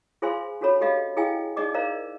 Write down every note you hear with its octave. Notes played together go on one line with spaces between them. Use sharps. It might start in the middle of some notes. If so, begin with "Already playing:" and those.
F4 G#4 C5 F5 G#5 C6
C#4 D4 F#4 A4 C#5 B5
G4 A4 D#5 F5 B5
E4 G#4 D#5 F5 G5 G#5
D#4 G#4 D5 D#5 D6
A#4 C5 D5 D#5 F5 A#5